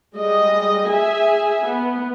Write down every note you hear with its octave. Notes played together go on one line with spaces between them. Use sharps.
G3 G#3 D#5
G#4 E5 G#5
B3